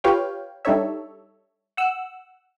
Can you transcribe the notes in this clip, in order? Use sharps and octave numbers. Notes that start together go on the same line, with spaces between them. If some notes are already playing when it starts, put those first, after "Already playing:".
F4 G4 B4 C#5 F5 G5
G3 D4 D#4 A4 C#5 E5
F#5 E6